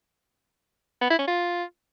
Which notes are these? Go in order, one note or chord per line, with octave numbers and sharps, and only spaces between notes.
B3
E4
C#4
F4